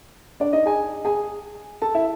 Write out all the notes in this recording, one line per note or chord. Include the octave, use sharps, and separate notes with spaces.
D4 D5
D#4 D#5
G#4 G#5
G#4 G#5
A4 A5
E4 E5